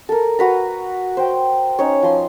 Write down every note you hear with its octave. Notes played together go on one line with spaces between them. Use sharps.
A4 A#4
F#4 B4 A#5
C5 G5
C#4 D#4 C#5
F3 C6